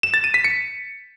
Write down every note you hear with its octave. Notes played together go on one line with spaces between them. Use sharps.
E7
A6
D#7
B6
C#7